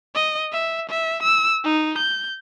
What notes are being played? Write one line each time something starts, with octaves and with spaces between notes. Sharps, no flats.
D#5
E5
E5
E6
D#4
G6